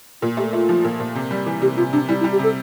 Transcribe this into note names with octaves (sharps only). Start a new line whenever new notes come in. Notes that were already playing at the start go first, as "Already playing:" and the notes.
A#2 F4
A3 G4
A3 F4
F3
A#2
A#2
C3
G3
E3
C3 G4
C3 F4
C3 D4
G3 E4
E4
G3
G4
C3 A4